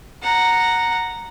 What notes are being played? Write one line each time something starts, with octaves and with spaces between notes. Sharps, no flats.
F#5 A#5